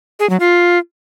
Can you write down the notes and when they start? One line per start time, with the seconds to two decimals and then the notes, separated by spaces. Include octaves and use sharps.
0.19 G#4
0.30 F#3
0.40 F4